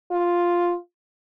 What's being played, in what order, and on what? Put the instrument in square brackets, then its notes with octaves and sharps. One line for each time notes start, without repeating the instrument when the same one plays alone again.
[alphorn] F4